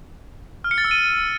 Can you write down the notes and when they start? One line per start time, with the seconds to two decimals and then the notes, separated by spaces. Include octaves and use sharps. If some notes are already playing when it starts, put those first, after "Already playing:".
0.64 F6
0.71 C#7
0.78 A6
0.84 E6
0.91 D#7